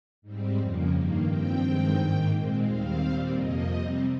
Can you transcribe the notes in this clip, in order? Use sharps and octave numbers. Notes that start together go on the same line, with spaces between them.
G#2 G3 C4
F2 C#3 F3 A#3
G2 D#3 A#3
G2 F3 C4 G5
G2 D#3 G#3 C4
G#2 D#3 A#3
A#2 G#3 C4
D#2 D#3 G3 C4 F5
A#2 G3 C4
F2 C3 F3 A#3 D#5
C3 G3 C4